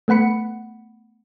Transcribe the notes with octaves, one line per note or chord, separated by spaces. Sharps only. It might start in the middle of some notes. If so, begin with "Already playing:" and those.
A3 B3 F#5 B5 C#7